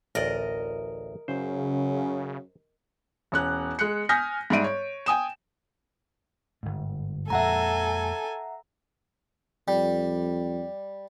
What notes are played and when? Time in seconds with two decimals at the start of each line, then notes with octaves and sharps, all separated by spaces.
0.15 A1 D2 A#4 D5 D#5
1.28 F#2 C#3 C5
3.32 E1 C#4 F#6
3.79 G#3 F#6 C#7
4.09 G#5 D#6 F6 G6 A#6 B6
4.50 G#2 G3 E5 D7 D#7
4.64 C#5
5.06 G5 G#5 D#6 E7
6.63 G1 G#2
7.30 F2 A#2 G#3 A4 E5 F#5 G#5 A#5
9.68 F2 G3